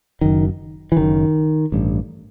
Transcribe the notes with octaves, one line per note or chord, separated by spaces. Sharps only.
F#1 F#2 D#3
E3
F#1 F#2 D#3
A1 G2